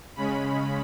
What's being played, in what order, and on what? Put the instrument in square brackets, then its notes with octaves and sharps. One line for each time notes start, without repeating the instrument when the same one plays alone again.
[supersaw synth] C#3 G#3 C#4 B5